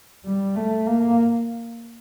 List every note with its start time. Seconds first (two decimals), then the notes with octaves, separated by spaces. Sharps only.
0.24 G3
0.56 A3
0.87 A#3